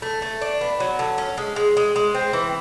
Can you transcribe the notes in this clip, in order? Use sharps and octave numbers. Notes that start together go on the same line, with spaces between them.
A3
A3
D4
B3
F#3
D3
C#4
G#3
G#3
G#3
G#3
C4
E3